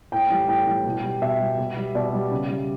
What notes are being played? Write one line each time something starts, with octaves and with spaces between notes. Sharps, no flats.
A2 G5
E3 G3
A2 G5
E3 G3
B2
G3
B2 E5
G3
B2
G3
B2 D5
G3
C#3
G3